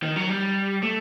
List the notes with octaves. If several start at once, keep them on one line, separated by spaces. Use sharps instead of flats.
D#3
F#3
G3
A3